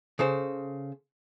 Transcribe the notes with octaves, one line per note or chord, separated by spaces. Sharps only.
C#3 A4 C5